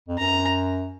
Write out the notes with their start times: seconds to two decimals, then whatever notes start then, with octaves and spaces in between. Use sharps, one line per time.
0.08 F2
0.18 F#2 A#5